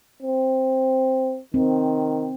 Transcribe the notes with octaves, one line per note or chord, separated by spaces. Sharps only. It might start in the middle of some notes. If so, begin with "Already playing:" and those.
C4
D#3 C4